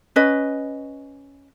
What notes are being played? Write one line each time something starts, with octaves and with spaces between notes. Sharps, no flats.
C#4 B4 D#5